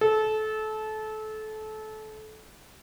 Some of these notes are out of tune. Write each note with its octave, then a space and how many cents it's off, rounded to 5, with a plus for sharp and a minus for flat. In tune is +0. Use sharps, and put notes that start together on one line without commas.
A4 -25